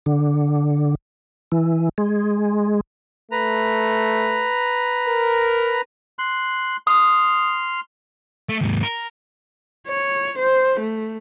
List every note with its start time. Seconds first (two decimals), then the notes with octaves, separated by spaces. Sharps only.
0.06 D3
1.52 E3
1.98 G#3
3.32 A3 B4 A#5
5.08 A#4
6.19 C6 F#6
6.87 C6 D#6 F6
8.49 A3
8.61 D#2 G#2
8.83 A#4
9.88 C#5
10.39 C5
10.80 A3